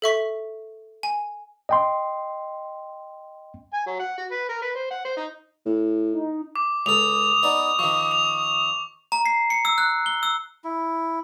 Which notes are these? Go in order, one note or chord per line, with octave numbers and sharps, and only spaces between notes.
A4 E5 C#6 B6
G#5
D#5 G5 C6
G#5
F#3
F#5
F#4
B4
A#4
B4
C5
F#5
C5
D#4
A2
D#4
D6
C#2 A4 D#6 F7
B3 D#4 D5
D#3 F3 C#6
F7
A#5
C7
C#7
E6
F#6
G7
E6
E4